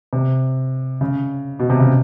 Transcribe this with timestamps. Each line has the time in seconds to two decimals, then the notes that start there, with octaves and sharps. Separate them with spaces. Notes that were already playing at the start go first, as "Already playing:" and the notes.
0.13 C3
1.01 C#3
1.59 B2
1.70 C3
1.79 C#3